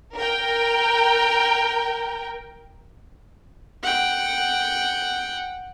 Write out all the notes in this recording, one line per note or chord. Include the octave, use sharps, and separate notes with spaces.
A#4 G5
F#5 G5